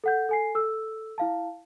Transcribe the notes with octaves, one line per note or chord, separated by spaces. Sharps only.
A4 F#5 G6
A4 G#5 C7
A4 E6
E4 F5 A5